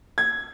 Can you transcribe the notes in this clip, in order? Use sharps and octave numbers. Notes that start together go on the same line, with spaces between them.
G#6